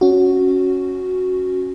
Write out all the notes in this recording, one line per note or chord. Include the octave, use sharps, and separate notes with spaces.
C#4 F#4